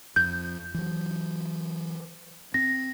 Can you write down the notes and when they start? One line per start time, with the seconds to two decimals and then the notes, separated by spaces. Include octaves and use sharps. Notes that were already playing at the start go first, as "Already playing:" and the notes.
0.16 F2 G6
0.74 E3 F#3
2.54 C4 A#6